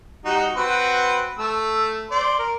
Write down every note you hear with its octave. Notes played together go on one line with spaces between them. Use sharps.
G3 D#4 F#4
C4 F#4 B4
A3 E6
C5 D5
A#4